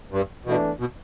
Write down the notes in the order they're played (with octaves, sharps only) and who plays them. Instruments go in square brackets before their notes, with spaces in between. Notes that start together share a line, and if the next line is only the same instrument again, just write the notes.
[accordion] G2
[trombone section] E2 E3 A3 D4 [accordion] B2
[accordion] B2